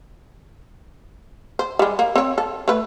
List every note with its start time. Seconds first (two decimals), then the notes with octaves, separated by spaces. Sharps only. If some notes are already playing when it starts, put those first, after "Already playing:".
1.59 C5
1.79 G3 G#3
1.99 A#3
2.16 C4 C#5
2.38 A4
2.68 A3 B4